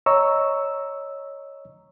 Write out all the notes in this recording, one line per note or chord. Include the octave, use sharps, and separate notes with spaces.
C#5 D#5 A#5 C#6 E6